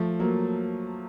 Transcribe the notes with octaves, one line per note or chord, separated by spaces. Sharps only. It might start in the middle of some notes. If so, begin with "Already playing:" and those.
Already playing: F3 A3
F#3 A#3